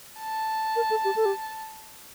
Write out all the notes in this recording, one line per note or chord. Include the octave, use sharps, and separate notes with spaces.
A5
A#4
A4
G4
A4
G4